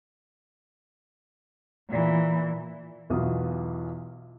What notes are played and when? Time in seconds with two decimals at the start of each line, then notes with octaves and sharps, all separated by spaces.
1.89 A#2 E3
3.10 B1 E2 E3 F4 F#4 D#6